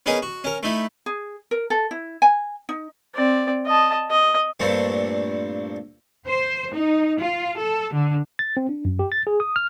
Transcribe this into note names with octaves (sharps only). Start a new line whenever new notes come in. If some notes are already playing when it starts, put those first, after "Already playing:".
B3 C#4 D#4 G#4 A#4
F#4
C#4 A#4
A3 D#4 E4
G#4
A#4
A4
E4
G#5
D#4
C4 D5
D#5 A5
D#5
G2 A#2 A3 C4
C5
D#4
F4
A4
D3
A6
C4
D4
F#2
G4
A6
G#4
D#6
F6